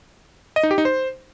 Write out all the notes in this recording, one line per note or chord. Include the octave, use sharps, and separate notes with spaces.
D#5
D#4
G4
D#4
C5